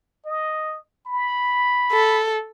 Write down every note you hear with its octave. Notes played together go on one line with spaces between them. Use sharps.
D#5
B5
A4